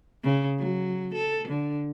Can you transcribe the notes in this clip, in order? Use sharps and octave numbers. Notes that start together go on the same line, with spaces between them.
C#3
F#3
A4
D3